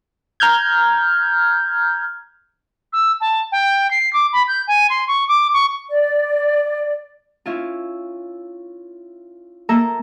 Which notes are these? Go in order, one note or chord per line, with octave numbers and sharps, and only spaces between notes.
A#5 F6 G6 G#6
E6
A5
G5
C7
D6
B5
G6
G#5
C6
C#6
D6
C#6
D5
C#4 E4 F4
A#3 A4 E5 A#5 E6